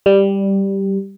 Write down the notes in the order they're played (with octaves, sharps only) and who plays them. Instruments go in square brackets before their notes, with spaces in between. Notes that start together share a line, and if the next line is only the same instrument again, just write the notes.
[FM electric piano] G3